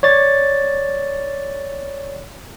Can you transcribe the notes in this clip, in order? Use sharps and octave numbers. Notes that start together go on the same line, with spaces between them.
C#5 D5 A6